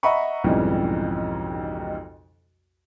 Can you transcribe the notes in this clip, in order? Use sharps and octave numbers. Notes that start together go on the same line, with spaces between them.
D#5 E5 F#5 A#5 B5 C#6
B1 F2 G#2 C#3 E3 G3